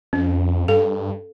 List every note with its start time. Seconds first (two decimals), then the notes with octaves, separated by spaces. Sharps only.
0.13 F2 C#4
0.68 G2 A4 F5